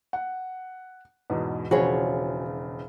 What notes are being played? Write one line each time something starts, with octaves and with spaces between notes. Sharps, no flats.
F#5
E2 G#2 B2
E1 C#3 E3 F3 F#4 G#4 C#5